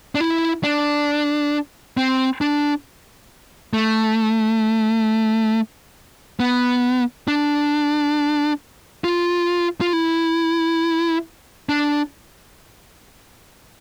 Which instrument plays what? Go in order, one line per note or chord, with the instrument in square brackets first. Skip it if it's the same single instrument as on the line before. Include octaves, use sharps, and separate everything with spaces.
[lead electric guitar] D4
E4
D4
C4
D4
A3
B3
D4
F4
F4
E4
D4